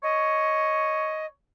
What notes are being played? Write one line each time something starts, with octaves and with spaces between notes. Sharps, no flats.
C#5 D#5